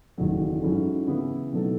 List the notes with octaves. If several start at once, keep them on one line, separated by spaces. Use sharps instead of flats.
F#1 E2 D#3 F#3 A3
G#2 F#3 C#4 E4 A4
C#3 E3 B3 E4
B2 F#3 A3 D#4 A4